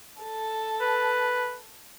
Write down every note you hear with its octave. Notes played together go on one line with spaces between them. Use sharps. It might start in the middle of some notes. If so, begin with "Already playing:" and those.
A4
B4